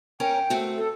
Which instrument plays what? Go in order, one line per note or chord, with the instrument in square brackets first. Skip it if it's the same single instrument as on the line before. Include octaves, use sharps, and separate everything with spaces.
[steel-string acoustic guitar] C#4 A#4 C#5 [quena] G5
[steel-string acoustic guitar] A3 C4 F#4
[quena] A4